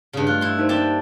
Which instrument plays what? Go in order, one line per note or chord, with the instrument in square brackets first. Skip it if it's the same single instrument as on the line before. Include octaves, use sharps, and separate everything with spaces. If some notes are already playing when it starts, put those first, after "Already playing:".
[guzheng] G2 C#3
[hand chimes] A3 F#6 [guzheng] F4
[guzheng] E4 C6
[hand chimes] D#4 A#4 C5
[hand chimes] A#3 [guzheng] D4 G4 A5